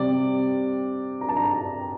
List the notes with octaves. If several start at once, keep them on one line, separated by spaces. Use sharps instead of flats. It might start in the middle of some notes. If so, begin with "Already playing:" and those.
Already playing: C3 G3 D5
A#5
A5
A#5